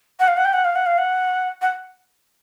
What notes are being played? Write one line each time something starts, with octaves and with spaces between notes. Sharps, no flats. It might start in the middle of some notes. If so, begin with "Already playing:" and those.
F#5
F5
F#5
G5
F#5
F5
F#5
F5
F#5
F#5